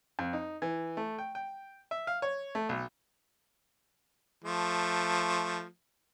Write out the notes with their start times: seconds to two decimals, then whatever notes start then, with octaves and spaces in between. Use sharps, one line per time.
0.19 F2
0.33 D#4
0.62 E3
0.97 A3
1.19 G5
1.35 G5
1.91 E5
2.07 F5
2.22 C#5
2.55 A3
2.69 B1
4.44 F3 A3